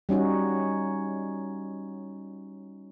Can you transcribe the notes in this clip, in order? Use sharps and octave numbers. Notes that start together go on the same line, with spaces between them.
G3 C#4 D#4 F#4